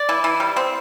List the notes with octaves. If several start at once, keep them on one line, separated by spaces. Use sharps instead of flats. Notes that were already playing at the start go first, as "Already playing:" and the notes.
Already playing: D5
E3
E3
G3
C4